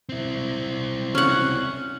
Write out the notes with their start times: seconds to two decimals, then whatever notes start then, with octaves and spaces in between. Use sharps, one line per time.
0.09 C4 E4
1.15 C#4 F#5